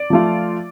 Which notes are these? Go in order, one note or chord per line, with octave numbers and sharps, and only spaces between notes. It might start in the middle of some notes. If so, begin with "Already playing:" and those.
Already playing: D5
F3 A3 F4